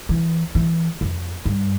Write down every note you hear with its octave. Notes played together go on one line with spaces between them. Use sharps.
E3
E3
F2
G2